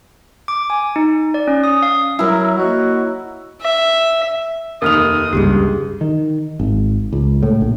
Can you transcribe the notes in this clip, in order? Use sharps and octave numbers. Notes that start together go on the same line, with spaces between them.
D6
G#5
D#4
D5
C#4
D#6
F5
F#3 E4 A#4 E5 A#5
A#3 F#4 C#5 D#5
E5
F1 D#2 A#4 D#6 F6 F7
F#1 C#2 G2 G4 G#4
D#3
G#1
C#2
A2
A#1